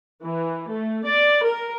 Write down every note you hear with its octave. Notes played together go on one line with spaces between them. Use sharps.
E3
A3
D5
A#4